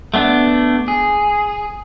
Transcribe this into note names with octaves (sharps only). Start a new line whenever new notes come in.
A3 B3 D4
G#4